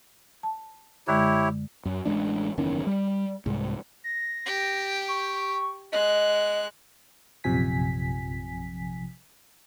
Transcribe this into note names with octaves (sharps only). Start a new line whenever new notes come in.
A5
F#2 D3 G#3 E4 G4 C#5
F#2
A1 E3 G#3 D4
F#1 E2 D#3 C#4
G3
C2 G#2
A#6
G4 G5
C#6
G#3 D#5 F#6
A#1 F#2 C3 F3 G#5 B6